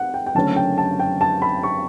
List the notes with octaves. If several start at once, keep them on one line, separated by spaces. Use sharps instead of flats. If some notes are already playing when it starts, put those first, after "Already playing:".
Already playing: F#5
G5
G5
F#1 F#2 D3 A3 C#4 A5
G5
A5
G5
A5
B5
C#6